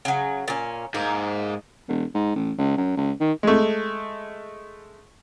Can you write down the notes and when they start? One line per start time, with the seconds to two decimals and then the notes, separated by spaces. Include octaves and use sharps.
0.05 C#3 F#3
0.48 A#2 C#4
0.94 G#2 A#3
1.88 E1
2.14 G#2
2.36 A1
2.58 C#2
2.77 F#2
2.97 C#2
3.20 D#3
3.43 G#3 A3